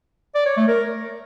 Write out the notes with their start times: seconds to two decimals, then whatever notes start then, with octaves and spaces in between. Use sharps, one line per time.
0.35 D5
0.46 C#5
0.57 A3
0.68 A#4